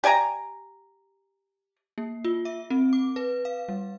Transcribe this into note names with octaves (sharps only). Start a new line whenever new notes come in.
G4 D5 G#5 A#5
A#3
F4
E5
C4
D6
B4
F5
G3